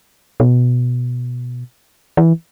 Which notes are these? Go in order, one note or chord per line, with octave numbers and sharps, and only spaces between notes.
B2
E3